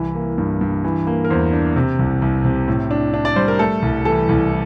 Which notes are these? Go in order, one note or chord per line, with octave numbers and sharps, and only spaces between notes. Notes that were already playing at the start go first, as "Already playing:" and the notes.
Already playing: C2 E3
A#3
G2
G2
E3
A#3
A#4
E2 C5
D4
C3
C2
C2
C3
A2
D4
D4
D5
G3 C5
A#4
A3 A4
C2
E3 A4
C2